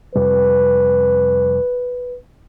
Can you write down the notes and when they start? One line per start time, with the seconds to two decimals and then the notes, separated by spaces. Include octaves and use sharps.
0.15 F2 C3 G3 B4